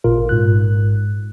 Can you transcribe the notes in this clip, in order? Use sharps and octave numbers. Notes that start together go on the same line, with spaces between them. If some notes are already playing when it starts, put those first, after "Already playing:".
A1 A#2 F4 A#4
G#2 F#6